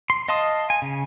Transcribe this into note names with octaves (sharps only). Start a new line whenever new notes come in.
C6
D#5 F5 A5 C6 D#6
G#5
C#3